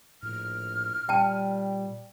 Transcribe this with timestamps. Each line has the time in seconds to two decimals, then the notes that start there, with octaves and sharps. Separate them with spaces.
0.23 A#1 A2 F6
1.09 A#2 G3 G5 A5